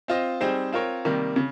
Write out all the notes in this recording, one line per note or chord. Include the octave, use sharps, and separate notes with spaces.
C4 F4 C5 D#5
G3 C4 D#4 G#4 C5
C4 F4 A#4 C#5
C3 D#3 G3 A#3
C#3